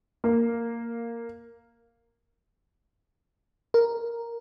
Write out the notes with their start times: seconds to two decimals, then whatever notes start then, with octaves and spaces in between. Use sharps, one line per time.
0.24 A#3
3.74 A#4